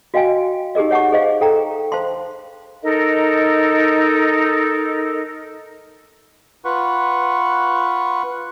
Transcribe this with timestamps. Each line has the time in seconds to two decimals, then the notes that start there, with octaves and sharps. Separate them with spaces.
0.14 F#4 D#5 F5 G5 G#5
0.75 D#4 G4 G#4 A#4 D#5
0.91 C#5 F#5 A5 C#6
1.12 G#4 C5 D#5 F5
1.41 A4 G5 A#5
1.92 C5 F5 A5 C6
2.83 D#4 A4 A#4 D#5
6.65 F4 B4 F#5 C#6